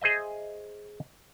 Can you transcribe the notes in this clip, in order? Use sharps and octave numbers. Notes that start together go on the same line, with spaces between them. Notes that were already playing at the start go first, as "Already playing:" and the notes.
G#4 C5 D#5 E5